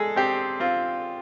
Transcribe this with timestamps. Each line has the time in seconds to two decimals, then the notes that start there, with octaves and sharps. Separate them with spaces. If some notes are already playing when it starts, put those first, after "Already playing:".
Already playing: G#3 G#4 A4
0.16 C4 G4
0.60 C4 F4